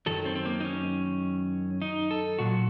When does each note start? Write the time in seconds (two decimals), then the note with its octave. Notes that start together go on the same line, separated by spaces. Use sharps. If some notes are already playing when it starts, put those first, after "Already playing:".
0.06 F#2 D#3 F#3 A4
0.25 C4
0.35 C4
0.46 A#3
0.60 D#4
0.65 C#4
1.82 D#4
2.11 A4
2.39 A#2 F#3 F#4